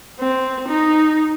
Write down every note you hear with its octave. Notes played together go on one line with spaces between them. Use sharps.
C4
D#4